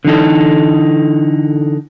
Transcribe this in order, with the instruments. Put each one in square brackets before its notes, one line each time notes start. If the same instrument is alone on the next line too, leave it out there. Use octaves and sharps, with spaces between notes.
[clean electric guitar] D3 E3 D#4 A4